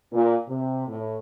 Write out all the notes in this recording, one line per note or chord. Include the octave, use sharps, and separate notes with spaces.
A#2
C3
A2